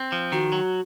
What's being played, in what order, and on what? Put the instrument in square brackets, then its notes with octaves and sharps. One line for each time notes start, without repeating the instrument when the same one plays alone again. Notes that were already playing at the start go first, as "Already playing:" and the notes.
Already playing: [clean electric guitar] C4
F3
[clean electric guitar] D#3 [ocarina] F#4
[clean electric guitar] F#3